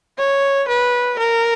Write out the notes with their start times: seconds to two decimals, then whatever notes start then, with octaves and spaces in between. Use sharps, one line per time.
0.18 C#5
0.68 B4
1.18 A#4